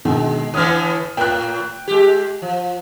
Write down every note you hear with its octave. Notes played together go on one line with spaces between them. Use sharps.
B2 D3 D#3 G#3
A2 D3 E3 D#6 F6
A2 G5 F#6
G#3 G4
F3